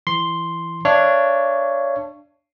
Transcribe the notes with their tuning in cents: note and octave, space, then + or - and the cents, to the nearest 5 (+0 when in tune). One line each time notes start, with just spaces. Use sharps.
E3 +15 C6 +0
D4 +0 C#5 +5 F5 -40